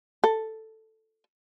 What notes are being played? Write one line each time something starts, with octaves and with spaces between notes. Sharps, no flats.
A4